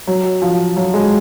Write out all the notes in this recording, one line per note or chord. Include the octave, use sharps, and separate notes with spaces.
F#3
F3
F#3
G#3